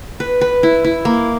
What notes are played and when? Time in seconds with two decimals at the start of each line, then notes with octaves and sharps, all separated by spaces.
0.20 B4
0.41 B4
0.63 E4
0.84 E4
1.05 A#3